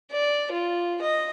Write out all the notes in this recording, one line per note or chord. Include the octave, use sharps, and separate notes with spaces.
D5
F4
D#5